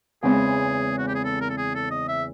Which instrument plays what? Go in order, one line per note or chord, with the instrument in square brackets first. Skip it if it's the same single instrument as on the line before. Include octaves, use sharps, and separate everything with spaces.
[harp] E2 C#3 E3 G#3 C4 [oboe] G#4
[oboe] F#4
G4
G#4
A4
A#4
A4
G#4
A4
D#5
E5